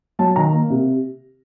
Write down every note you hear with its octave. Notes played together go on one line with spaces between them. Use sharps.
F#3 A5
D#3 A#5
A#3
C3